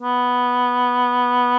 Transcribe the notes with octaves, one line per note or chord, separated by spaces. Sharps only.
B3